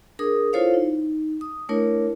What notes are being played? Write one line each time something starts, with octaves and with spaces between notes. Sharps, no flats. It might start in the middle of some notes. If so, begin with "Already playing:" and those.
D4 G#4 A#4 D#6
E4 F4 A4 C5 C#5 F5
D#4
D#6
A3 D4 E4 A#4 C#5